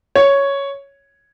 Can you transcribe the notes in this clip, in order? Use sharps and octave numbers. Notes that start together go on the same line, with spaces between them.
C#5